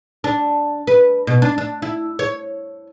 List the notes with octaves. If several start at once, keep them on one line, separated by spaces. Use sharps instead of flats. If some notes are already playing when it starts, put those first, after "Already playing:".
D4
B4
B2
D4
D4
E4
C#5